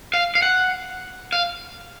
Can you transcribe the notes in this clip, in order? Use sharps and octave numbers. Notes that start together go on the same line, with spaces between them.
F5
F5
F#5
F5